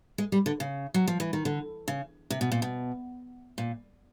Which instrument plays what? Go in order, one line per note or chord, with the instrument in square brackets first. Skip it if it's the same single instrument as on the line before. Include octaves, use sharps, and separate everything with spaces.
[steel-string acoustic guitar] G#3
G3
D3
C#3
F#3
F3
E3
D#3
D3
C#3
C3
B2
A#2
B2
A#2